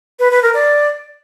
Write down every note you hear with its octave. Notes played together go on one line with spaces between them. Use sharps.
B4
B4
A#4
D5